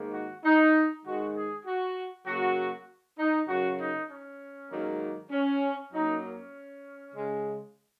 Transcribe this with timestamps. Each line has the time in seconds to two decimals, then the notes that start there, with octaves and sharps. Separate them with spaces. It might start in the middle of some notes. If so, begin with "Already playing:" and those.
Already playing: G#2 D#3 A#3
0.13 F#4
0.44 D#4
1.05 G#2 D#3 G#3 F#4
1.35 G#4
1.66 F#4
2.26 C#3 F#3 A#3 F#4
3.19 D#4
3.48 F#2 C#3 F#3 F#4
3.79 D#4
4.10 C#4
4.71 G#2 D#3 F#3 A#3
5.31 C#4
5.93 F#2 F#3 A#3 D#4
6.23 C#4
7.14 C#3 G#3